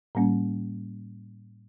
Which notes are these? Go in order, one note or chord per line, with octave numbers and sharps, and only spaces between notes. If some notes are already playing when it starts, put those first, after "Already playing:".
A2 G3 A#3 C#4